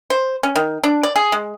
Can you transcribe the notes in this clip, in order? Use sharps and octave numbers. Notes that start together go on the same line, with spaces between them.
C5
C#4
D#3
D4
D5
G#4
G#3